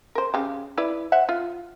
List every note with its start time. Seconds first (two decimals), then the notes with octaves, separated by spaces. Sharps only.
0.15 A#4 C5
0.34 C#3 G4
0.77 E4 B4 D5
1.12 C5 E5 F#5
1.29 F4